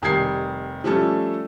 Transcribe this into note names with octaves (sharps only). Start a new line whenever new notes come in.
F1 D#3 G3 G#6 C7
F3 G3 A3 C#4 A4